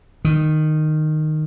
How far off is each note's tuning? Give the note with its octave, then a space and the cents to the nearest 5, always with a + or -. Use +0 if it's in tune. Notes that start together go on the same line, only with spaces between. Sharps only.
D#3 -10